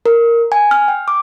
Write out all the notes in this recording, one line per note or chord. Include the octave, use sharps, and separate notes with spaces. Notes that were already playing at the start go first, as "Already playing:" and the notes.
A#4
G#5
F6
G5
D6